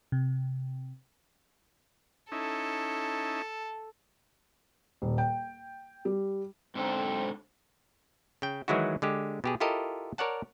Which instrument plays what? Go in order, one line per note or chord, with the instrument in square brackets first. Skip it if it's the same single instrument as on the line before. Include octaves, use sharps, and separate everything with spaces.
[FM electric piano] C3
[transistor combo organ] C#4 D#4 E4 [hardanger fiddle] A4
[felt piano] D#1
G5
G3
[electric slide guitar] G#2 D3 A4 [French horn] C4
[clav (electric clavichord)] C#3 G5
D#3 E3 F#3 G#3 E4 F#4
D3 G#3 G4
B2 G4 G#4
E4 F4 G4 A4 A#4 D#5
A#4 C#5 D5 F#5 A5